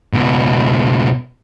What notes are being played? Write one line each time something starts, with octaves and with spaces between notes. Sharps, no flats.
C#2 B2